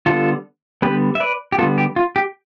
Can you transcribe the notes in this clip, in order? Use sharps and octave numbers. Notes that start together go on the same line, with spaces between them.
D3 G3 B3 F4 A4
D3 G3 B3 G4 B4
E5
B4 D5
G4
D3 G3 B3 F4 A4
G4
F4
G4